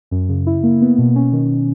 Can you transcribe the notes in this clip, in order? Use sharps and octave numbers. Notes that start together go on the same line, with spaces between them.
F#2
C#3
E4
A#3
B3
B2
C#4
D#3